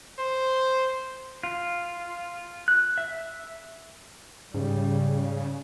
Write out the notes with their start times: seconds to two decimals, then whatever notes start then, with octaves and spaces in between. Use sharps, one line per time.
0.19 C5
1.43 F4
2.68 F#6
2.98 E5
4.54 G#2 C#3 G3